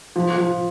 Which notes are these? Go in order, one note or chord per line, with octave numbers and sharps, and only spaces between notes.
F3
F3